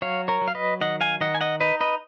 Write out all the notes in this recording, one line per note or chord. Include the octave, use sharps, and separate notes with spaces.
F#3 C#5 F5
A#4 C#5
F#3
F5
B4 D#5
D#3 D#5 F#5
F5 G#5
D#3 D#5 F#5
G#5
D#5 F#5
D#4 B4 D#5
B4 D#5